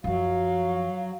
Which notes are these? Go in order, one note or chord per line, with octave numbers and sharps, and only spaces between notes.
F#2 F3 F#3 F5